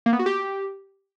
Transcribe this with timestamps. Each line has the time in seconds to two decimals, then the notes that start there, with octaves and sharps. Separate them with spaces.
0.06 A#3
0.13 B3
0.19 F#4
0.26 G4